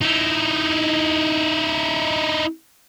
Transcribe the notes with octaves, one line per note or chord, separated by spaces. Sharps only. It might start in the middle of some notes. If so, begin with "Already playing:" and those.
D#4 E4